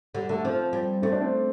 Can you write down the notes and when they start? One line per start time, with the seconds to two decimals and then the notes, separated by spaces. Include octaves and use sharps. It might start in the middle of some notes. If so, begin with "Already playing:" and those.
0.15 D3 G3
0.29 D3 A3
0.44 F3 C4
0.73 G3
1.02 A3 C4
1.12 D4
1.21 C4